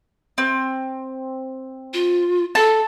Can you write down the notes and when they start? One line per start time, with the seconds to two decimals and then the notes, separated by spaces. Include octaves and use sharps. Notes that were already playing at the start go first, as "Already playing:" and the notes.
0.38 C4
1.94 F4
2.55 A4 A5